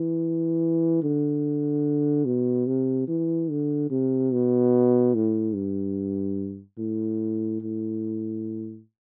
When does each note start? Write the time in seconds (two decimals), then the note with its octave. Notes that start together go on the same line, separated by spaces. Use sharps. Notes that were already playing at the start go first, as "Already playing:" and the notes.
Already playing: E3
1.03 D3
2.26 B2
2.67 C3
3.08 E3
3.50 D3
3.90 C3
4.33 B2
5.15 A2
5.55 G2
6.78 A2
7.62 A2